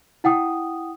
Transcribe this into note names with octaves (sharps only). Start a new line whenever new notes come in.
E4 F#5 G5 D#6